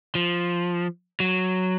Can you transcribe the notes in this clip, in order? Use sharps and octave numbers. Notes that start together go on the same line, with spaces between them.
F3
F#3